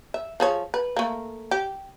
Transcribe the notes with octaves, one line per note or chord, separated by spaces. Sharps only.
E5
F3 G#4 C#5
B4
A3 A#3
G4